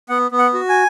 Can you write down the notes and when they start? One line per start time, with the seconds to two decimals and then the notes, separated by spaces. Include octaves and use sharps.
0.09 B3 F#5
0.31 B3
0.38 F#5
0.54 F#4
0.69 G#5